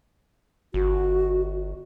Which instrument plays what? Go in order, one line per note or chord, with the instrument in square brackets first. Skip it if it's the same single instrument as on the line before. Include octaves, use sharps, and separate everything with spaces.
[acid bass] G1 [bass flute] F#4